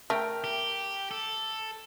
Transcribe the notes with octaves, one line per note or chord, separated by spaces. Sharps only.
A3 A#4 G5
G4
A4